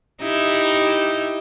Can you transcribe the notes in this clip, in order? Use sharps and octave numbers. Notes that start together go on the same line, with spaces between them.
D#4 E4 G4